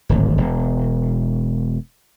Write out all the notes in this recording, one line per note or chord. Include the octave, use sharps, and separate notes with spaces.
D1 G#1
E1